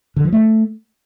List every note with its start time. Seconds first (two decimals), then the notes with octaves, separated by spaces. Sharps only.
0.16 D3
0.24 F3
0.33 A3